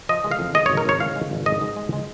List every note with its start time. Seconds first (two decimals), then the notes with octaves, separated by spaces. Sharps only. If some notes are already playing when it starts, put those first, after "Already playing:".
0.09 F3 D#5
0.24 G#3
0.31 F5
0.39 F2
0.54 G#3 D#5
0.66 G#1 C#5
0.77 A#4
0.85 G#1 C#5
1.00 G#2 F5
1.16 G#3
1.31 G#1
1.46 G#2 D#5
1.61 G#2
1.76 G#3
1.93 G#3